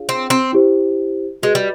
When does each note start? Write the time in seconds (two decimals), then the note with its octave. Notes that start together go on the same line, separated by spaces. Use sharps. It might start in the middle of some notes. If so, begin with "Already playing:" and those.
Already playing: D4 F4 G#4 C#5 F5
0.09 C4
0.30 C4
0.53 E4 G4 C5
1.42 G#3 F#4 B4 D#5
1.55 G3